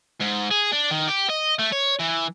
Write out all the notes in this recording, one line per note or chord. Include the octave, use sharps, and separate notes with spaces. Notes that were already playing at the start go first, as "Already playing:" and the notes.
G#2
G#4
D4
D#3
G4
D#5
A3
C#5
E3